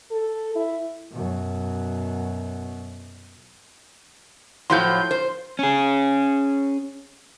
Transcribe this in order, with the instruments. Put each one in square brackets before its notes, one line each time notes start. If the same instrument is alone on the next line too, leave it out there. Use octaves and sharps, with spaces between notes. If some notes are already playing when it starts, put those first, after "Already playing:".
[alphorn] A4
E4
[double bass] F#2 B2
[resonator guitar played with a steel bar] A2 F3 F#3 [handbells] C6 G6
[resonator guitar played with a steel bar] C5
[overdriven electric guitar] C#4 G#4